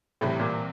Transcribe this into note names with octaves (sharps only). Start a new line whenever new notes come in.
C2 A2 C3 E3 G3
A#2